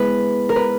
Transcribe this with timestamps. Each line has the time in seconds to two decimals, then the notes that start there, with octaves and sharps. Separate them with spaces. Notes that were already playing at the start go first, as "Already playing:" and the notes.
Already playing: G#3 B3 E4 B4
0.49 A#4
0.56 B4